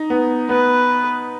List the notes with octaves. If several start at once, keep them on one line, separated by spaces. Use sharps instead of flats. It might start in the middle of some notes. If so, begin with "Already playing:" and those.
Already playing: D#4
B3
B3 B4